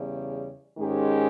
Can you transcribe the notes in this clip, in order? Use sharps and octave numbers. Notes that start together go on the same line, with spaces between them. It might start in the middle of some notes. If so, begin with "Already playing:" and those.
Already playing: E2 C#3 G3
G#2 D#3 G#3 C#4 G4